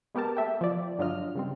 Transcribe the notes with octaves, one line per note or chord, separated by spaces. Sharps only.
G#3 B3 G4 A#4 A5
A3 E5 G5
F3 D5
G2 D3 F#3 F4 D#5 F6
C#3 G3 C4